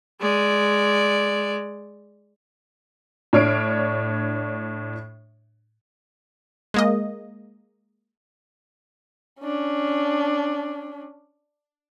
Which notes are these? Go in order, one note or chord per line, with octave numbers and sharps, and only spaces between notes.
G#3 D5
A2 D4 C#5 F6 C7 D7
G#3 A#3 D#5
C#4 D4